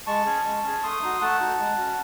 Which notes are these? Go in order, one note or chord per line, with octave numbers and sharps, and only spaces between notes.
G#3 A5 C#6
C#4 G#4
G#3
C#4 G#4
A3 C6 D#6
D#4 F#4
A3 F#5 A5
D#4 F#4
G#3
C#4 F#4